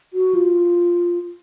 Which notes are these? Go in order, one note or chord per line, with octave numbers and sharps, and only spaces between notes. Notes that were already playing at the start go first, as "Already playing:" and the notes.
F#4
F4